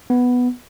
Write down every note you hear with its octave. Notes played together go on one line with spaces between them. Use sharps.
B3